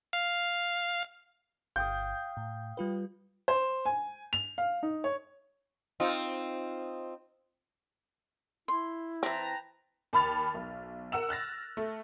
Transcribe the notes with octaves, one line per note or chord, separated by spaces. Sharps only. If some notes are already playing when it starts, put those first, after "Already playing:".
F5
G1 F5 G5 D#6 G6
A2
G3 F4 B4
C5
G#5
F7
F5
D#4
C#5
C4 D#4 F4
E4 C6
E3 C4 B4 G5 A5 A#5
D#2 A5 B5 F6 A6 F7
B1
A#4 F#5 E6 E7
F6 F#6 A6 A#6
A3